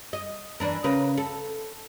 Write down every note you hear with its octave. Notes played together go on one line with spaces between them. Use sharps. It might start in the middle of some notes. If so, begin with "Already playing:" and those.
D#5
E3 D4 A#4
C#3 A#4 B4
A4